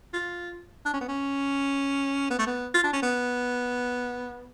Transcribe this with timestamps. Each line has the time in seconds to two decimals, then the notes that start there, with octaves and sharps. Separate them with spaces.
0.13 F4
0.85 D4
0.94 C#4
1.01 B3
1.08 C#4
2.31 B3
2.39 A3
2.47 B3
2.74 F4
2.84 D4
2.93 C#4
3.03 B3